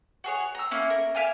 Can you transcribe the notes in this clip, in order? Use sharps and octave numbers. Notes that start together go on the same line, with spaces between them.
F#4 G#4 C#5
A#5 E6
A#3 C#4 E4
A#4
E5 F5 G#5 D6